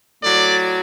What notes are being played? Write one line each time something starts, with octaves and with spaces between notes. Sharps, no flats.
A2 F#3 D5